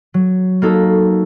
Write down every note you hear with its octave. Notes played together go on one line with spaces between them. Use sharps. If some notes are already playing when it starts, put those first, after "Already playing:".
F#3
A#3 D#4 F#4 A4